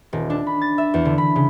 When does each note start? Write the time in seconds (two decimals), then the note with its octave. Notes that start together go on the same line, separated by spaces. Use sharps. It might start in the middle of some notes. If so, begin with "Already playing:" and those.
0.13 D#1
0.30 D4
0.47 B5
0.62 A6
0.78 E5
0.94 E2
1.05 D3
1.18 B5
1.36 C#3